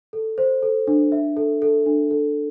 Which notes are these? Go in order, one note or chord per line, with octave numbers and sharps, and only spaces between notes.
A4
C5
A4
D4
E5
A4
A4
D4
A4